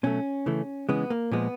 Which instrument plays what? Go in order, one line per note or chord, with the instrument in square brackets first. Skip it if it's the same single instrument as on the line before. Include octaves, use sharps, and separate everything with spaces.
[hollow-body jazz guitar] B2 F#3 A3 C#4
C#3 E3 A3
C#3 E3 G#3 B3
A#3
A#2 F3 G#3 B3